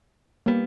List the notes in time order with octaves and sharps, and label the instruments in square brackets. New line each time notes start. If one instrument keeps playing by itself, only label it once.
[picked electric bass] G3 B3 [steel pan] A#3